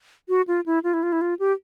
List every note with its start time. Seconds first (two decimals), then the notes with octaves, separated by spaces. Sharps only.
0.29 F#4
0.48 F4
0.66 E4
0.83 F4
0.94 E4
1.03 F4
1.12 E4
1.21 F4
1.39 G4